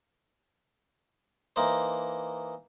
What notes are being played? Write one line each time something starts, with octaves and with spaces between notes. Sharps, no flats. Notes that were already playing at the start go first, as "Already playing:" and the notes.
E3 A#3 D#4 C5